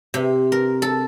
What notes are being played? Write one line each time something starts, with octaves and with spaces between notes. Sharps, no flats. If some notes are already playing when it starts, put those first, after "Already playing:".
C3
A#4
A4